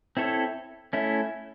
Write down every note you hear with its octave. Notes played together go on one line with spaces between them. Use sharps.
C4 E4 A4 C#5
A3 C#4 E4